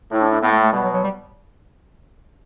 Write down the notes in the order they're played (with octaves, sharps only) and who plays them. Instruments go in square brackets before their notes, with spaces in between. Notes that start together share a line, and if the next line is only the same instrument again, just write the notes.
[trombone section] A2 [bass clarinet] E4
[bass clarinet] D4
D4
[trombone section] A2 [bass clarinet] B3
[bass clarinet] A3
A3
[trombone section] B2 [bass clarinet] G3
[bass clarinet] F#3
F#3
G3